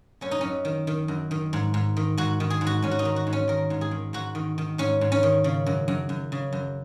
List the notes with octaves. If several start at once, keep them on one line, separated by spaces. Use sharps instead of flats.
F#2 C#4
D#4
F#2 C#4
D#3
D#3
F#2
D#3
G#2
G#2
D#3
G#2 F#4
D#3
G#4
G#2
F#4
G#2 C#4
F#4
D#4
D#3
F#4
G#2
C#4
D#3 A#4
G#2
G#4
D#3
G#2 F#4
D#3
D#3
G#2 C#4
G#2
C#4
D#3
C#3
F#2
F#2
F#2
C#3
F#2